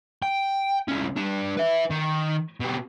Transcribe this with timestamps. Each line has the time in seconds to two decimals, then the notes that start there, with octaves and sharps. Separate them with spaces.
0.22 G5
0.88 C2 C#4
1.17 G3 D4
1.57 B4 E5
1.91 D#3
2.60 B2 G4